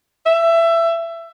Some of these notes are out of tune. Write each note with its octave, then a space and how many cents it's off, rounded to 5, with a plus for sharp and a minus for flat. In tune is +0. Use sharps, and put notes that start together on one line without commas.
E5 +20